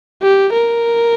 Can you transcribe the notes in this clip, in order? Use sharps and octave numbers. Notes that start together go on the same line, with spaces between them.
G4
A#4